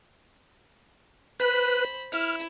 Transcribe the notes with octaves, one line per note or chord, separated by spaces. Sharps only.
B4 C5 B5
E4 F6